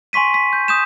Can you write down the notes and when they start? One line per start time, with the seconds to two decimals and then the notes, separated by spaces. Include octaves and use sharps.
0.13 G#5 C6 C#6 B6 D#7
0.34 B6
0.53 G6
0.68 D#6 G6 E7